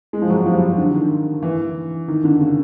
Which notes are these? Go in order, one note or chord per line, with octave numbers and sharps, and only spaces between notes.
G#3
F3
F#3
F3
G3
D3
D#3
E3
D#3
D3
C#3